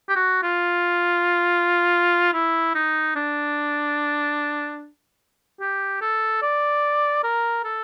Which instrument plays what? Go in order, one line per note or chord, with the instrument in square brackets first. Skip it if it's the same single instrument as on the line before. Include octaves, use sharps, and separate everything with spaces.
[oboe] G4
F#4
F4
E4
D#4
D4
G4
A4
D5
A#4
A4